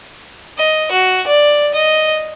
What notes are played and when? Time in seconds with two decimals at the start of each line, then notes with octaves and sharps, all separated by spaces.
0.58 D#5
0.92 F#4
1.27 D5
1.74 D#5